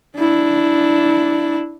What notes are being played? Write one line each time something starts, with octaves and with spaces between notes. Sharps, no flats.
D4 E4